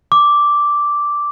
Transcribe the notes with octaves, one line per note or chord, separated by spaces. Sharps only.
D6